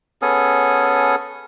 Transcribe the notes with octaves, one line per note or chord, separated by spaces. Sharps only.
B3 C#4 G#4 A4